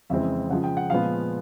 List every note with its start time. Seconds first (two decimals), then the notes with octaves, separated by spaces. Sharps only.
0.10 F2 C#3 E3 G#3 C4 E5
0.50 C#3 F3 G#3 F#5
0.64 G5
0.77 F#5
0.90 A#2 F3 G#3 B3 F5